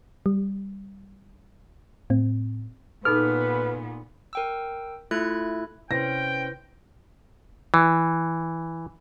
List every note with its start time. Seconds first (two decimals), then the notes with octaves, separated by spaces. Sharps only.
0.26 G3
2.10 A2 C4
3.05 A#2 B3 D#4 G#4 A4 B4 F6
4.33 A#4 G5 E6
5.11 A3 E4 F4 A4 F#6 G#6
5.91 C3 C#4 E4 B4 C5 G5 A#6
7.74 E3